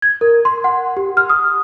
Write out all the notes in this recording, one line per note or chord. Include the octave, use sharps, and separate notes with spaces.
G#6
A#4
C6
F#5
G4
F6
D#6